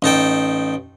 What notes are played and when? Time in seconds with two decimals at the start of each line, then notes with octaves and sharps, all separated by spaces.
0.02 A1 D#4 A4 G5